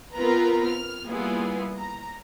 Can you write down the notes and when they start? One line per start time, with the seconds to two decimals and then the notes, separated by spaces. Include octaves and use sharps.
0.14 B3 C4 F4 A#4 B4 A#5
0.66 F6
1.08 G3 A#3 B3 E4 F4 G#4
1.79 A#5